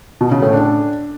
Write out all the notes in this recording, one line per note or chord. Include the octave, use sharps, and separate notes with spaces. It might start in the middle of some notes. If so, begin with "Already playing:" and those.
B2
C#3
A2
D4